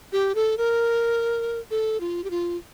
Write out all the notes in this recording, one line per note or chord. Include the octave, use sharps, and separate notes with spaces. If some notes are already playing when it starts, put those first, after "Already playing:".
G4
A4
A#4
A4
F4
G4
F4